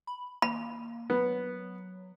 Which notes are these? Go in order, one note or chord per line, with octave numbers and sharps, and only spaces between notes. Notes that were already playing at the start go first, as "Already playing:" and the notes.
B5
A#3 B5
F#3 B3